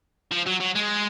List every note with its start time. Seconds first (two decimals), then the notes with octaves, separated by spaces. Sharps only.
0.32 F3
0.46 F#3
0.60 F#3
0.76 G#3